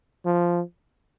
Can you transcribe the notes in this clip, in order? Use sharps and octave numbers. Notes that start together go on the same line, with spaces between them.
F3